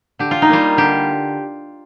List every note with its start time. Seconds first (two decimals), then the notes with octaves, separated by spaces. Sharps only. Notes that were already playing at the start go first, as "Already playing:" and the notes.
0.19 D3 G4
0.31 F4
0.42 D#4
0.49 G3 A#3 F4
0.77 D3 G4